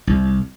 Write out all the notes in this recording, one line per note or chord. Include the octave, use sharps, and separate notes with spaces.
C2